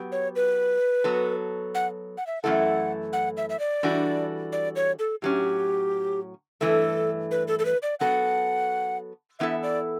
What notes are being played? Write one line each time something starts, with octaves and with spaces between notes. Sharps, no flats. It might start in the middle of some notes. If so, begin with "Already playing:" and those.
Already playing: F#3 B3 G4
C#5
B4
F#3 B3 F#4 A4
F#5
F#5
E5
F#2 E3 A3 E4 A4 F#5
F#5
E5
E5
D5
E3 G3 D4 F#4 A4
D5
C#5
A4
A2 F#3 C#4 G4
G2 E3 A3 A4
B4
A4
A4
B4
D5
F#3 B3 F#4 A4 F#5
E3 B3 E4 A4 E5
D5